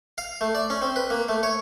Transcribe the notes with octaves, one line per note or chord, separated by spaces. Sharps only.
F5
A3
D5
C#4
C4
B4
A#3
A3
C#5